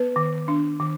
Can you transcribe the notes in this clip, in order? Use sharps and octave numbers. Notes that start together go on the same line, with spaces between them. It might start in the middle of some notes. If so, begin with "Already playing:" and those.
Already playing: B3 B4
D#3
D4
D#3